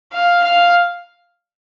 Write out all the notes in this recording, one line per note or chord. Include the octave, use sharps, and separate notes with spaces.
F5
F5